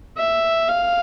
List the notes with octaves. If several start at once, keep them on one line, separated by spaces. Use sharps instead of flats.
E5
F5